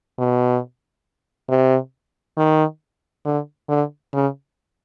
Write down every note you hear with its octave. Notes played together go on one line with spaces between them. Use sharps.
B2
C3
D#3
D3
D3
C#3